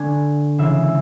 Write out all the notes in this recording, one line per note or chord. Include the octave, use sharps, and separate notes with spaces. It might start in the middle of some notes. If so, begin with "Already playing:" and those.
Already playing: D3 A3 D4 G#5
C#3 E3 G#3 E5